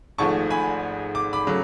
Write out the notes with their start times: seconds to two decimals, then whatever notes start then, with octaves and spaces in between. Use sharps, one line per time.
0.18 G#1 G#2 F3 A3 A5 C#6
0.50 G#5 B5
1.15 D6
1.33 B5 D6
1.47 C#3 F#3 A3